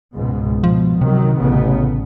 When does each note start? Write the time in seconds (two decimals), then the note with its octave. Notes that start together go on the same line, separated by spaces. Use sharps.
0.16 C#2 G#2 B2
0.64 B2 F3
1.01 C3 D#3 F#3
1.38 A1 C#3 B3